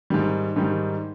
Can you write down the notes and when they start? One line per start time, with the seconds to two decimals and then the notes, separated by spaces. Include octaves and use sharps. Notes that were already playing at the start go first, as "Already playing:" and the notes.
0.10 G#2 D#3 G3
0.56 G#2 D#3 G3